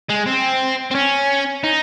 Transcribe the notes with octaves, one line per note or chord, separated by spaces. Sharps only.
G#3
C4
C4
C#4
D#4